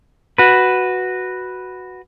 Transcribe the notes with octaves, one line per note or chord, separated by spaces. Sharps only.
F#4 B4